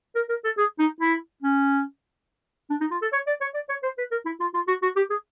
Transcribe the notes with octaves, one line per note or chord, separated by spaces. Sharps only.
A#4
A#4
A4
G#4
D#4
E4
C#4
D4
D#4
F4
A4
C#5
D5
C#5
D5
C#5
C5
B4
A#4
E4
F4
F4
F#4
F#4
G4
G#4